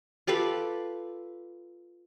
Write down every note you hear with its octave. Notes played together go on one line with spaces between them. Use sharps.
F4 G4 A4 B4